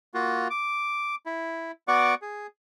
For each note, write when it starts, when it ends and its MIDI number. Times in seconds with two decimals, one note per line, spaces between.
0.14 0.48 58
0.14 0.48 65
0.14 0.48 66
0.50 1.15 86
1.26 1.71 64
1.88 2.15 59
1.88 2.15 66
1.88 2.15 74
1.88 2.15 78
1.88 2.15 85
1.88 2.15 86
2.22 2.47 68